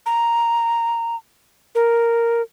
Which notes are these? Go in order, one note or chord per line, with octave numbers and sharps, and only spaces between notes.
A#5
A#4